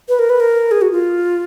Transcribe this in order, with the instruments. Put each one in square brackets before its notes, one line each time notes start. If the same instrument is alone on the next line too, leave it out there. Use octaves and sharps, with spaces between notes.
[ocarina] B4
A#4
B4
A#4
G#4
F#4
F4